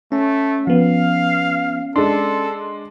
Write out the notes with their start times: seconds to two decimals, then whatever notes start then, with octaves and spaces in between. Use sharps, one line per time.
0.12 A3 C#4
0.67 F3 B3 F5
1.96 G#3 D4 A4 C6